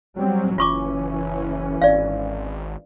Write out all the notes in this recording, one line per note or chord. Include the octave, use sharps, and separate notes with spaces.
F#3 G3 C4
F#1 E3 C#4 F4 C#6 D6
G#1 D5 F5